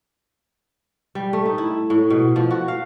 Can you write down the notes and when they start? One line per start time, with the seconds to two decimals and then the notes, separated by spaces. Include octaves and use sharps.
1.15 G3
1.33 A3
1.46 D#4
1.58 E4
1.90 A2
2.10 B2
2.36 F3
2.51 F#4
2.68 F5